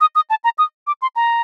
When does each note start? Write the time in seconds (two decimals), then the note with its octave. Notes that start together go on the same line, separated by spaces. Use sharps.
0.01 D#6
0.15 D#6
0.30 A5
0.44 A#5
0.58 D#6
0.87 D6
1.02 C6
1.16 A#5